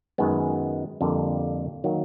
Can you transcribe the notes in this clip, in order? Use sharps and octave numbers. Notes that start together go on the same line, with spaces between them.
F#2 D#3 G#3 B3
F2 D3 G3 A#3
D#3 F#3 A#3